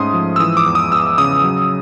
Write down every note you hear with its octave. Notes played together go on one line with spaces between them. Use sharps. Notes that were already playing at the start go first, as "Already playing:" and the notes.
Already playing: G#2 A3 C#4 C6 D#6
F3
E6
E3 D#6
D6
E2
D#6
E2 E6
C#3 D#6
F#3